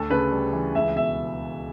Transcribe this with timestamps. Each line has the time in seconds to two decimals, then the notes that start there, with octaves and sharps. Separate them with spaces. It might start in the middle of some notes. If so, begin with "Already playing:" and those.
Already playing: D2 A4
0.10 C#3 B4
0.32 G3
0.53 E3
0.75 C#2 E5
0.96 B2 E5